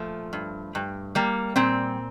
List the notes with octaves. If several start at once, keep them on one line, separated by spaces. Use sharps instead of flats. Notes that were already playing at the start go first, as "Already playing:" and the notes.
Already playing: A#2 F3 A3
G2
G2
G3 A#3
A#2 C4